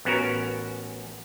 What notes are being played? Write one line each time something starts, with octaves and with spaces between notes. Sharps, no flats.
A1 B3 C#4 F#4 A#4